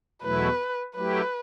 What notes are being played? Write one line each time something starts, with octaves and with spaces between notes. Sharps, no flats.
E2 B2 F#3 A3 E4 B4
F#3 A3 E4 G4 B4